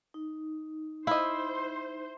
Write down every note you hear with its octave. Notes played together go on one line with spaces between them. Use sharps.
D#4
E4 C5 D#5 F5